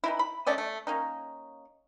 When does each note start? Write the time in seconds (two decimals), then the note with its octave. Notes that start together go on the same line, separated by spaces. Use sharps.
0.04 E3 D#4 E4
0.19 B5
0.46 A3 C#4 D5 D#5
0.58 A3
0.87 A#3 C#4 D#4